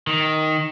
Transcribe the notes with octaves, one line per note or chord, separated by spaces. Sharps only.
D#3